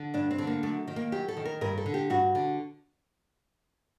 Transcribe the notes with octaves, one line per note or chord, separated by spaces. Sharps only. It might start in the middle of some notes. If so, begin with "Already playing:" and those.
Already playing: D3
G2 D4
C4
D3
A#3
F#2 A3
D#3
A#3
F#2 G4
A4
D#3
A#4
G2 A#4
A4
D3
G4
G2 F#4
D3